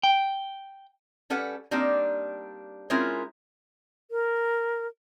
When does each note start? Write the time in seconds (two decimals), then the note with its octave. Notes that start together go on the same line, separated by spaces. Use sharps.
0.03 G5
1.30 G3 C#4 A4 B4 F#5
1.71 G3 A#3 C4 D4 D#4
2.90 G#3 C4 C#4 E4 F4 A#4
4.11 A#4